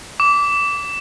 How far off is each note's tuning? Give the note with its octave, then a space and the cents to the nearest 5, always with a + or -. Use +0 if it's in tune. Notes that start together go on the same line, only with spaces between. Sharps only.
D6 -20